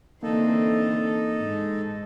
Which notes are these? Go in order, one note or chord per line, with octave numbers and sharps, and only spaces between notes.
D3 E3 A#3 C4 D#4 A4
G#2